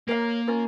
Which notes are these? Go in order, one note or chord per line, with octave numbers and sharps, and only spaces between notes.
A#3 A#4 C#5 F5
C#4 F4 A#4